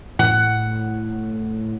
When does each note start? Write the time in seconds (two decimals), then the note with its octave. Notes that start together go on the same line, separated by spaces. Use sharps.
0.19 A2 F#5